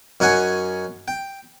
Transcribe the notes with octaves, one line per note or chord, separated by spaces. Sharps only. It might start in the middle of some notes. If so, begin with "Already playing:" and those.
F#2 D#4 C#5 F#5 G#5
G5